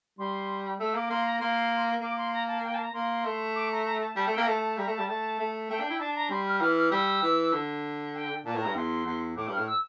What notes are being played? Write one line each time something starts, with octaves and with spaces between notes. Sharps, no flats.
G3 C6
A3 E6
A#3 D6
A#3 C6
A#5
A#3 C6
A#3 D6
C6
A#5
A5
G5
A5
A#5
A#3 C6
A3
D6
A#5
A#5
A5
G3 A5
A3 G5
A#3
A3 A5
A5
G3 A#5
A3
A5
G3
A3 A5
A3
A3 G5
D4 G5
E4
D4 A5
A#5
G3 C6
F6
E3 F6
F6
G3 E6
E3
D3
G5
A#2 A5
A2
G2 A#5
E2 C6
E2
A2 D6
G2
F6
A2
E6